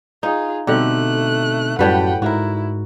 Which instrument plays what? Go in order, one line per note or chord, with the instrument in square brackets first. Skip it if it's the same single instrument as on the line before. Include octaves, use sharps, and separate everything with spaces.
[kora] D#4 [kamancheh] F4 G#4
[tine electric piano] B2 C4 D#4 [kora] D3 G3 [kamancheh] A3 F#6
[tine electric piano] F#2 F#4 A5 [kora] A2 G3 B4 [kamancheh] F#5 G5
[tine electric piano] G#2 [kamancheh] E4 [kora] F#4 A#4